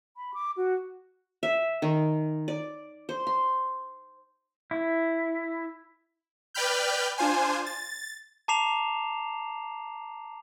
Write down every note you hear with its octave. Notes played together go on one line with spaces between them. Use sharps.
B5
D6
F#4
E5
D#3
D5
C5
C6
E4
B4 D5 G5 B5 F6 G6
D4 F4 C5 G#5
A6
A5 A#5 D6 C7 E7 F7